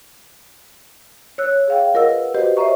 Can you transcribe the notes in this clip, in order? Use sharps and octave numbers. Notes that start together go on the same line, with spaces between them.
C#5 E6 F#6
G#4 F5 G5
F4 A#4 D#5 F#5 E6
B4
F#4 G4 B4 C5 D#5
C5 C#5 D#5 E5 A#5 C#6